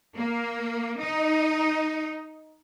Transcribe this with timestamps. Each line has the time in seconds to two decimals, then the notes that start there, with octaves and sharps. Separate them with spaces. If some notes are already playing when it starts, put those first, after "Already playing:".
0.15 A#3
0.98 D#4